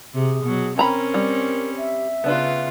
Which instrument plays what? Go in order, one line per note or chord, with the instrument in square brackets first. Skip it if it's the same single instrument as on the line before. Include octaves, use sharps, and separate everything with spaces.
[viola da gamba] C3 [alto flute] G#4
[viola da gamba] B2 F#3
[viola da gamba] C4 C#4 [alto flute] A#4 [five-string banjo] G5 A#5 B5
[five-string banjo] G3
[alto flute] E5
[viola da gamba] C#3 F4 [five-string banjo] B3 D4 B4